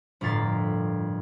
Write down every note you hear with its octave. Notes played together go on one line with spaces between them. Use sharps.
G1 F2 A2 A#4 A6 C7